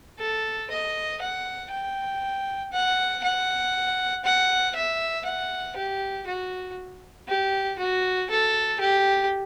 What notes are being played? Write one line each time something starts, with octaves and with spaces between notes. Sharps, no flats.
A4
D#5
F#5
G5
F#5
F#5
F#5
E5
F#5
G4
F#4
G4
F#4
A4
G4